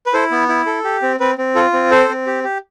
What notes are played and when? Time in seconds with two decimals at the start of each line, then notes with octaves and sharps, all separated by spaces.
0.06 B4
0.14 E4 A4 C5
0.31 B3
0.48 E4
0.66 A4
0.84 G4
1.02 C4
1.20 C4 B4
1.38 C4
1.55 F4 A4
1.73 C4
1.91 A4 C5
2.09 C4
2.27 G4
2.44 G4